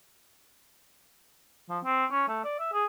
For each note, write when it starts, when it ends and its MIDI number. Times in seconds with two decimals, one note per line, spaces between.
1.69 1.79 53
1.84 2.05 60
2.12 2.25 61
2.29 2.44 57
2.44 2.56 74
2.59 2.71 76
2.73 2.86 68